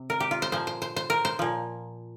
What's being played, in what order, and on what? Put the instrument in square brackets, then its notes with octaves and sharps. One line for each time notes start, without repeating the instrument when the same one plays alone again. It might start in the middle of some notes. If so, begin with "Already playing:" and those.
Already playing: [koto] C3
A#4
G4
F4
C5
A#2 F3 C5
C5
C5
C5
A#4
C5
A#2 F3